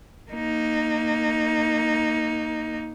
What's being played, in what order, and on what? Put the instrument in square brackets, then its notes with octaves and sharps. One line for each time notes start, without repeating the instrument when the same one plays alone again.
[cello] A#3 D#4